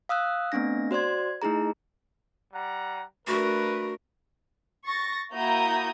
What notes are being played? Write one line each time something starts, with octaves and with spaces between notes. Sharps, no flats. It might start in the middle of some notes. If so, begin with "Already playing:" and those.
F5 D#6 E6 F#6
A3 B3 C4 D4 A#6
F#4 C5 D5 C6 G#6
A3 D#4 E4 G#4 A#5
G3 F#5 A#5
A3 D4 F#4 A#4 B4
C#6 A6 A#6
A#3 E4 F#4 A#5 D#6 G6